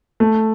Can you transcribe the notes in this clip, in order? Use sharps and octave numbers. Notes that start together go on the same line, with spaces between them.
A3